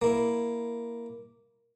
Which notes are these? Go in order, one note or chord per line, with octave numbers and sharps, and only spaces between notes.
A#3 E4